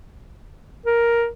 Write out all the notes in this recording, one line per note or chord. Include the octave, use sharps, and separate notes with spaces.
A#4